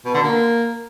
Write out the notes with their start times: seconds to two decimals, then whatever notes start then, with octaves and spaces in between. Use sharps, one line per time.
0.05 B2
0.14 D3
0.24 A#3